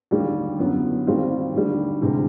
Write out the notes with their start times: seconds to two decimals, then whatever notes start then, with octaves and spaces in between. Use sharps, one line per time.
0.11 D#2 D3 G3
0.59 F#2 D3 F#3 B3 E4
1.06 D#2 D#3 G3 C4 F4
1.53 D#2 D3 G3
2.01 D2 C3 E3 G#3